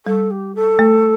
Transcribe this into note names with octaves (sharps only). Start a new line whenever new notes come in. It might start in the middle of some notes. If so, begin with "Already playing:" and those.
G3 A4
G4
A4
A3